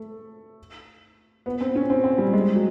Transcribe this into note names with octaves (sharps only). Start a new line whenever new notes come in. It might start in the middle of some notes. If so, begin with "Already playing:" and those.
Already playing: A3
B3
C4
C#4
C4
C4
G3
G#3
F#3